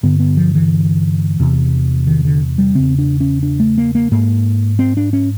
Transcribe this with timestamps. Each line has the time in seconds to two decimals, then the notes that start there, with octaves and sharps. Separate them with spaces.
0.03 G2 D3 B3
0.20 B3
0.37 F3
0.55 E3
1.40 E2 C3
2.07 D#3
2.25 D3
2.58 G3
2.75 E2 C#3 C4
2.98 D4
3.20 C#4
3.43 D4
3.60 A3
3.78 A#3
3.95 A#3
4.11 G#2 A#3
4.79 C4
4.97 D4
5.13 C#4